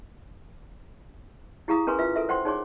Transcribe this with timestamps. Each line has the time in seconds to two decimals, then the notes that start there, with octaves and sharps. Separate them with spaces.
1.68 E4 G4 G#4 F5 A#5 D#6
1.87 C#4 G#4 A#4 B4 G#5 C6
1.99 F4 B4 E5 E6
2.16 A4 A#4 E5
2.29 C5 F#5 G5 C6
2.45 D#4 G#4 C#5 C6 D6